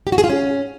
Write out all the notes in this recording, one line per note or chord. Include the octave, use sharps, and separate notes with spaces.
G4
F#4
G#4
F4
C#4